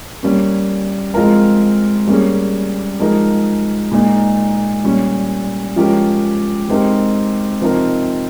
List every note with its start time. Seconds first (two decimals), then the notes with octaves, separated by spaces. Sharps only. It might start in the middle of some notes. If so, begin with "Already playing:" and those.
0.23 G3 A#3 C#4
1.14 F3 G#3 C4 F4 A#4
2.07 G3 A#3 C#4 G#4
3.00 F3 G#3 D#4 A#4
3.91 A#2 G#3 D#4
4.84 A#2 G3 C#4
5.76 F3 G#3 C#4 G4 A#4
6.68 G#3 C4 D#4 G4 A#4
7.61 C3 F3 C4 D#4 A#4